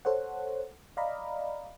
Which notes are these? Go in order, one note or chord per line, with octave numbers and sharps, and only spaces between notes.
A4 C5 C#5 F#5
D5 D#5 F5 A#5 B5